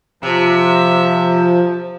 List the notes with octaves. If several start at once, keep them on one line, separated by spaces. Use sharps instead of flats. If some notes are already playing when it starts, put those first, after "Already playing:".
C3 F3 E5